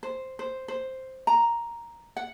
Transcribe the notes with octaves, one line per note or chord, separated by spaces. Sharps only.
C5
C5
C5
A#5
F#5